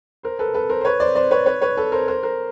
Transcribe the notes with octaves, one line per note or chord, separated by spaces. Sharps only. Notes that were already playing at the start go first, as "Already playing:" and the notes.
A#4 C5
A4 B4
A4 B4
A#4 C5
C5
B4 C#5
C5 D5
C5 D5
B4 C#5
B4 C#5
B4 C#5
A4 B4
A#4 C5
A#4 C5
A#4 C5